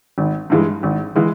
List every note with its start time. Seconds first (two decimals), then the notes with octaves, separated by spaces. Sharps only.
0.18 G#1
0.50 G2 E3 G#3
0.83 G#1
1.16 E3 G#3